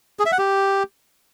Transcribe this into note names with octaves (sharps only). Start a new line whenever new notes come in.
G#4
E5
F#5
G4